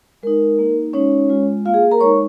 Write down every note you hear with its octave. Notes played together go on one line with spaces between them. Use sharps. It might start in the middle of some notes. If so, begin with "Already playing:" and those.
G#3 D#4 A#4
A#3 D#4
G#3 C#4 D#4 C#5
G#3 F4
A#3 F4 F5
G#4
A#4 A#5
G#3 D#4 C#5 C#6